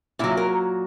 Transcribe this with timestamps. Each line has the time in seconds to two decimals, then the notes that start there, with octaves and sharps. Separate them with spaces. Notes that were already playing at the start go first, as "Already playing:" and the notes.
0.19 A#2 F#3 E4
0.37 A#4